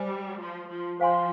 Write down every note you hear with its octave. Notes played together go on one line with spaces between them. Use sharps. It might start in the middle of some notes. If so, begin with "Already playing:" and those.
Already playing: G3 C5 D#5 G#5
F3
F3
F3 C5 F5 G#5 C6